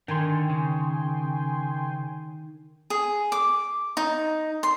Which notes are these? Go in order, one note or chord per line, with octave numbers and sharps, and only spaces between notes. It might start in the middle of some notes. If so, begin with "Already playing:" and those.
D3 D#3 G5 G#5 C6
C#3
G#4
D6
D#4
C6